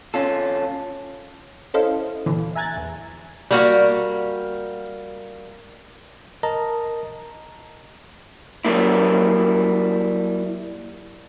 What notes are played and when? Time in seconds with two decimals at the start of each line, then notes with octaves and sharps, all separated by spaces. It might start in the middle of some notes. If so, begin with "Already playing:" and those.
0.14 C#4 F4 A4
1.74 C#4 E4 A4 C5 D#5 F5
2.26 D2 A#2 D3 E3
2.55 E5 G#5 A#5 F#6 G#6 A6
2.77 E2
3.51 G3 A#3 F#4
6.43 A#4 D#5 A5 A#5
8.65 F#3 G3 A#3 E4